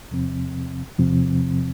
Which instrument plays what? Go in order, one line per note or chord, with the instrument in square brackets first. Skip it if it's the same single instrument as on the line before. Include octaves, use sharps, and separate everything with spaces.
[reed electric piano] E2 C3 F3 C4
E2 C3 F3 C4